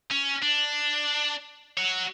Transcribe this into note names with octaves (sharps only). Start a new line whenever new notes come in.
C#4
D4
F#4 C#5